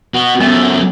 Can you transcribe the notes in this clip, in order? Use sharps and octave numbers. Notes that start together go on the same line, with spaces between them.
B3 F#4
F#2 A3 B3